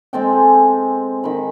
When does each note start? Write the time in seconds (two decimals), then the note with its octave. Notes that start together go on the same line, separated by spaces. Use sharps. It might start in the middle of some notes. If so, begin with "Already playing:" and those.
0.13 G#3 C4 A4 G5
0.33 G#4
1.24 D#3 B5